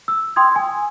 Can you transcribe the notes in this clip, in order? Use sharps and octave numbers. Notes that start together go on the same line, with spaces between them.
E6
G5 C6 D#6 G#6
G#5